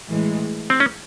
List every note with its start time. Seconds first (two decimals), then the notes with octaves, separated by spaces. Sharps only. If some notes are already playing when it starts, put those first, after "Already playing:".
0.09 A2 E3 G#3
0.70 C4
0.80 C#4